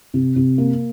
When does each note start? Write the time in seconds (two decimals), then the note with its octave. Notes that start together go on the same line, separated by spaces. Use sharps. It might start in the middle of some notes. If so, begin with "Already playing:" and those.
0.14 C3
0.36 C3
0.58 A#3